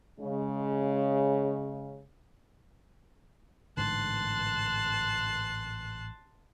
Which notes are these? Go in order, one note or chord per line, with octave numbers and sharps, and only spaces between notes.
C#3 G#3
A1 G#2 D3 A5 C6 F#6